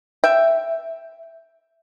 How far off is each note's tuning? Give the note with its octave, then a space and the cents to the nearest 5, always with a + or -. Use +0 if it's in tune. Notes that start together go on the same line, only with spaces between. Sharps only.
E5 +0 G5 +0